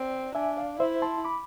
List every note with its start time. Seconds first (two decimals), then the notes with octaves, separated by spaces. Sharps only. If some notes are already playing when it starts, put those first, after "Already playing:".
Already playing: C4 D5
0.35 D4 E5 G#5
0.57 D5 F5
0.79 E4 C5 E5
1.02 A5 C6
1.25 B5 D6